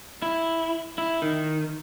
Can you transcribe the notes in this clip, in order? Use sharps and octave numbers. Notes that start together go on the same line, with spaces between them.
E4
E4
D#3